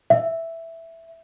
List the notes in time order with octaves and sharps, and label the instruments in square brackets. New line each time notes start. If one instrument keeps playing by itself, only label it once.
[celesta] E5